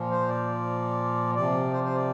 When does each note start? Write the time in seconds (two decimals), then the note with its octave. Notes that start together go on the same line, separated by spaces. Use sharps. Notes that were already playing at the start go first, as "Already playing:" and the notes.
Already playing: A#2 F3
0.11 C5
0.28 D5
1.35 C3 F3 D5
1.72 C5
1.84 C5
1.95 D5